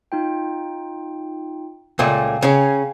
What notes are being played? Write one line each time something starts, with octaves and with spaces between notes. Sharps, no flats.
D#4 F4 G5
C#2 A#2 A3 F5 G5 G#5
C#3 C#4